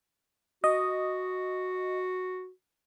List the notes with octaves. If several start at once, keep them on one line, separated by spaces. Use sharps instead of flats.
F#4 D#5